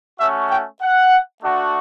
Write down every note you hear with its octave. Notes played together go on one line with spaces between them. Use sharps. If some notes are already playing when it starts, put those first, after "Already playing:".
A3 C#4 F#4 E5
G5
F#5
A3 D4 F#4